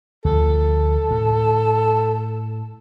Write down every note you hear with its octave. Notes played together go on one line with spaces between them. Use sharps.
D2 F3 A4
A2